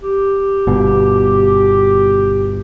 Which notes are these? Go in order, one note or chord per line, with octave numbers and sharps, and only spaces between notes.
G4
G1 B2